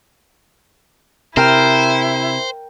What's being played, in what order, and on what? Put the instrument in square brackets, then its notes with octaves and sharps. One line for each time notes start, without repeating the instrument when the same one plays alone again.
[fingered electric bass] C3 [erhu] E4 [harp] A#4 G5 F6 [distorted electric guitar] C5